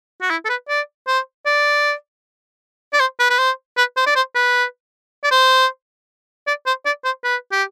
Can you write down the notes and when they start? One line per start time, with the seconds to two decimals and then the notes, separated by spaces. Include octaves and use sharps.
0.22 F#4
0.30 E4
0.45 A4
0.49 B4
0.69 D5
1.07 C5
1.46 D5
2.93 D5
3.00 C5
3.19 B4
3.30 B4
3.39 C5
3.77 B4
3.97 C5
4.06 D5
4.16 C5
4.35 B4
5.24 D5
5.31 C5
6.47 D5
6.66 C5
6.86 D5
7.04 C5
7.24 B4
7.52 G4